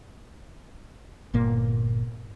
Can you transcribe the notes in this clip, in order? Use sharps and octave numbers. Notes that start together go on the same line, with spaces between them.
G1 A#2 A#3